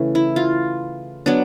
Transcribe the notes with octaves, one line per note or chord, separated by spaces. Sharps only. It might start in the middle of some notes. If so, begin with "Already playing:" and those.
Already playing: C#3 E3 A3
E4
F4
F#3 B3 D4